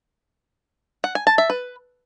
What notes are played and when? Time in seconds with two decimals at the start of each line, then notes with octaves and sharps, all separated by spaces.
1.04 F#5
1.15 G#5
1.27 A5
1.38 E5
1.50 B4